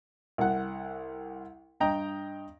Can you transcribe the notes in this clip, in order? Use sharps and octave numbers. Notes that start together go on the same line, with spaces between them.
C2 F#5
G2 D#5 G5 A#5